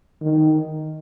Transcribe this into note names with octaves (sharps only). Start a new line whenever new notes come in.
D#3